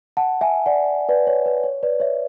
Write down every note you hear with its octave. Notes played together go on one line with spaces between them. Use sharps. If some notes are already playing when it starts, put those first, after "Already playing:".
F#5 A5
E5 G#5
D5 F#5
B4 D5
C#5
B4
C#5
B4 D5
C#5 E5